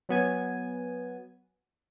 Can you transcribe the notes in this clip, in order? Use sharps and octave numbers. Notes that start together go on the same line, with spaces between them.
F#3 B3 G#5